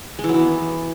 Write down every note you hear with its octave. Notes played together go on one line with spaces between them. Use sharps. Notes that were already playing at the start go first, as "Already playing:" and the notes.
G#3
E3
F#3
E3
B3